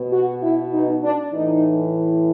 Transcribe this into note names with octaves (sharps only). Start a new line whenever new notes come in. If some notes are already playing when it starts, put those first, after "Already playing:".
Already playing: B2
F#4
E4
D#4
D4
A2 E3 D#4